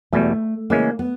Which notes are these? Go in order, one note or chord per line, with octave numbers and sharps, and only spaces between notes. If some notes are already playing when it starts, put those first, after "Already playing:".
E2 B2 G3 A3
C#3 E3 G#3 A#3 C#4
B3